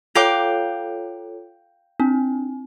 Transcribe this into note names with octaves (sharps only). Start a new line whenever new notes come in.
F4 A4 C#5 F5 G5 D6
C4 D4